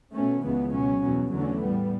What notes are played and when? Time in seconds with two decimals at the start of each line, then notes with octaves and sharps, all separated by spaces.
0.12 B2 A3 C#4
0.43 C#2 C#3 E3 B3
0.72 B2 F#3 C#4
1.02 E2 B2 F#3
1.31 E2 D3 F#3 A3 C#4
1.61 A2 G3 B3